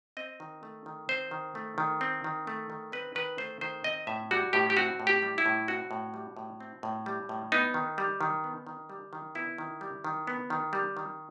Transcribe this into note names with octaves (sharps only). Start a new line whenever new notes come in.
C4 D#5
D#3
A3
D#3
C4 C5
D#3
A3
D#3
C4
D#3
A3
D#3
C4 B4
D#3 B4
A3 C5
D#3 C5
C4 D#5
A2 E5
G3 F#4
A2 G4
G4
C4 F#4
A2
G4
G3
E4
A2
C4 F#4
A2
G3
A2
C4
A2
G3
A2
B3 D#4
D#3
G3
D#3
B3
D#3
G3
D#3
B3 E4
D#3
G3
D#3
B3
D#3
G3
D#3